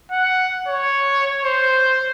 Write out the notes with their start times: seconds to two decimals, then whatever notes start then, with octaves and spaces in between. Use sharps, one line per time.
0.11 F#5
0.68 C#5
1.45 C5